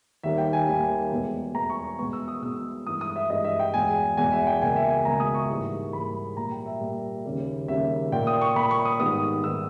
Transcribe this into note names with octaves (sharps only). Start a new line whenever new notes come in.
D#2 D#3 G3 A#3 E5
G5
G#5
D#2 D#3 G3 A#3
E2 B2 G#3 B3
E2 B2 G#3 B3 A#5
C#6
C#6
B2 G#3 B3 C#6
E6
D#6
B2 G#3 B3 E6
G2 E3 G#3 D#6
D#6
E5
G2 E3 G#3 D#5
E5
G5
E2 B2 G#3 G#5
E2 B2 G#3 G#5
E5
G5
C#2 B2 A#3 G#5
E5
G#5
C#2 B2 A#3 A#5
D#6
C#6
G#2 E3 G3 A#3
G#2 E3 G3 A#3 B5
A#2 G3 A#3 A#5
G5
E5
A#2 G3 A#3
D#2 C#3 G3 A#3
D#2 C#3 G3 A#3 E5
A#2 A#3 G5
D#6
C#6
A#2 A#3 B5
C#6
D#6
G#2 D#3 G3 B3 D#6
G#2 D#3 G3 B3 E6